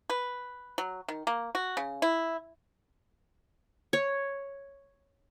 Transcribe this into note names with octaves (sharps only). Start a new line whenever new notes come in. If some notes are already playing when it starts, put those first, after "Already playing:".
B4
F#3
D#3
A#3
F#4
C#3
E4
C#5